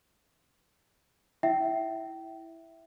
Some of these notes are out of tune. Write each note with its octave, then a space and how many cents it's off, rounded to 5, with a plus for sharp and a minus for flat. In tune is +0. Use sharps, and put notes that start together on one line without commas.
E4 +0 E5 +0 G5 -25